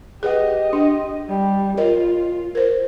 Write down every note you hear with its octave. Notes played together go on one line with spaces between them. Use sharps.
G4 G#4 B4 D#5 F#5
D4
G3
F4 A#4 C#5 D#5
A#4 C5